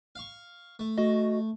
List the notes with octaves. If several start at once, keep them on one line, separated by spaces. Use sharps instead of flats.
F5 C#6
A3
A3 F#4 D#5